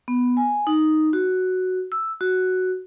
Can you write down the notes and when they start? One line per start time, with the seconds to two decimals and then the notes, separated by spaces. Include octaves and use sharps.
0.08 B3
0.37 G#5
0.67 D#4
1.13 F#4
1.92 E6
2.21 F#4